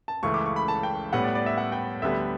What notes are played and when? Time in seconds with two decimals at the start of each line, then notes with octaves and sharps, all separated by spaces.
0.08 A5
0.23 C#2 C#3 E3 A3 C#6
0.34 D6
0.46 C#6
0.56 B5
0.68 A5
0.83 G5
1.13 A2 G3 B3 F#5
1.23 D5
1.35 D5
1.46 E5
1.58 F#5
1.72 G5
2.02 D2 D3 G3 B3 E5